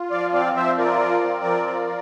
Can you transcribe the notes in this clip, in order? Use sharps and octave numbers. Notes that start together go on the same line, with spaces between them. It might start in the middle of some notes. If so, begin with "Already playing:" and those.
Already playing: F4
F3 D5 F5
C4 D5 F5
F3 C5 E5
F4 A#4 D5
F3
C4
F3
F4